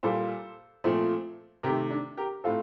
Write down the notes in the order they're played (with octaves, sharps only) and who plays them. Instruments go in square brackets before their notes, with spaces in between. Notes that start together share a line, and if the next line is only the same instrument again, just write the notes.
[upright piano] A#2 G3 A#3 A4 C5
A#2 F3 A3 C4
C3 D#3 A3 G4 A#4
D4
G4 A#4
A2 A3 C4 F4 A4